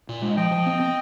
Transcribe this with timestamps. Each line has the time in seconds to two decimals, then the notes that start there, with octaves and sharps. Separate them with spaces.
0.09 A#2
0.22 G#3
0.37 F3 D#5 G5
0.52 F3
0.66 C4
0.80 C4